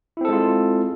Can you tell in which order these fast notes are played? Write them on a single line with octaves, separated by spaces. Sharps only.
E4 C4 A4 G#3 F4